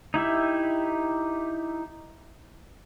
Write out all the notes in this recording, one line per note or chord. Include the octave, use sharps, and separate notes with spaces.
D#4 E4 G4 E5